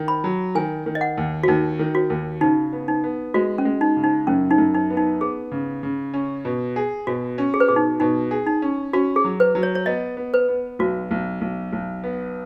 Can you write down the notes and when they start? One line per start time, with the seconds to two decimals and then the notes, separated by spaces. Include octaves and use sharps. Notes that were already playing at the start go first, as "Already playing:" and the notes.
Already playing: D#3
0.08 B5
0.24 F#3
0.55 D#3 G#5
0.86 D#3
0.95 D#5
1.01 F#5
1.18 D#2
1.43 F#4
1.48 D#2 D#4
1.79 D#3
1.95 F#4
2.10 D#2
2.41 C#3 D#4
2.73 B3
2.88 D#4
3.04 B3
3.34 G#3 F#4
3.58 C#4
3.65 G#3
3.81 D#4
3.97 C#3
4.04 D#4
4.27 F#2 C#4
4.51 D#4
4.58 F#2
4.74 D#4
4.90 B3
4.97 D#4
5.21 B3 G#4
5.52 C#3
5.83 C#3
6.14 C#4
6.45 B2
6.76 G#4
7.07 B2 F#4
7.38 C#4
7.54 G#4
7.60 B4
7.69 B2 G#4
7.76 D#4
8.00 B2 D#4
8.31 G#4
8.47 D#4
8.62 C#4
8.93 C#4 F#4
9.16 G#4
9.24 F#3
9.40 B4
9.55 F#3
9.63 C#5
9.75 C#5
9.86 B3 D#5
10.17 B3
10.34 B4
10.48 B3
10.79 B1 F#4
11.11 B1
11.41 B1
11.73 B1
12.04 B3